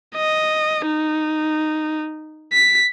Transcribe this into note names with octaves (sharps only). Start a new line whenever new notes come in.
D#5
D#4
B6